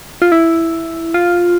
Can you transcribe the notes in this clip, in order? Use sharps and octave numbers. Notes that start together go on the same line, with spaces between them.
F4
E4
F4